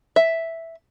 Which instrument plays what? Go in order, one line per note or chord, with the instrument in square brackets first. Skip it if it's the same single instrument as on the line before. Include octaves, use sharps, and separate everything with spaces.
[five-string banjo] E5